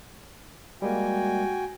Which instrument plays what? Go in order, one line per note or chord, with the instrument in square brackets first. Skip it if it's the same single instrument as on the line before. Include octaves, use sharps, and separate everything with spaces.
[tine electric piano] G3 G#3 A#3 [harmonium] F#4 G5 G#5